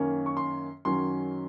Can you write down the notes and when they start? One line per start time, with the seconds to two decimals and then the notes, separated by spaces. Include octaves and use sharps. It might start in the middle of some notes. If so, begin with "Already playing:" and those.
Already playing: F#2 D#3 A#3 C#4
0.26 C#6
0.37 C6
0.85 F#2 D#3 F#3 C#4 C6